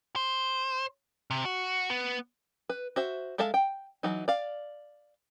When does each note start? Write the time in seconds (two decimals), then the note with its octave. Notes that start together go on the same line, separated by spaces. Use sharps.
0.16 C5
1.30 C3
1.45 F#4
1.90 B3
2.69 B4
2.96 F#4 C5 E5
3.38 G#3 A4 E5 F5 A5
3.54 G5
4.03 E3 F#3 D#4
4.28 D5 F5